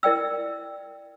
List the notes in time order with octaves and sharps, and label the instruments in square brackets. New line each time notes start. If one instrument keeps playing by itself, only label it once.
[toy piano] E4 A#4 D5 G5 E6